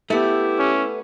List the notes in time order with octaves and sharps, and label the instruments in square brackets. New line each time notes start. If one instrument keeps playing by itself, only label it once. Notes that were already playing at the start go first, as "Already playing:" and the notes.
[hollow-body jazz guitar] A3 B3 [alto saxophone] E4 [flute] G4
[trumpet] C#4